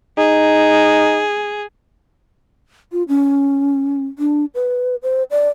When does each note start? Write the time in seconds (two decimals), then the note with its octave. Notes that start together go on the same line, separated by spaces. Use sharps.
0.18 D#4 G#4
2.92 F4
3.08 C#4
4.19 D4
4.55 B4
5.03 C5
5.31 D5